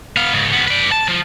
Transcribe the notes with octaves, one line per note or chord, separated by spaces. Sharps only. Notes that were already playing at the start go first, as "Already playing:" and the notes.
B3 F5
G#2 C#3
D#2 B3
B4 D5
A5
F3